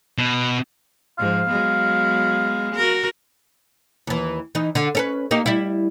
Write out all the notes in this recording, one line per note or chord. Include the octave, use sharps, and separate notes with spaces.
B2
G#2 F3 F5
F#3 G#3 B3
F#4 A#4
D#2 E3
E3 D#4
D3
C#4 A4 B4
A#3 D#4 G4
G3 E4